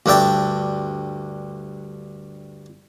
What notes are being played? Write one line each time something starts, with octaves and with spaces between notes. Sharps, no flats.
D2 G2 D4 E5 G5 A5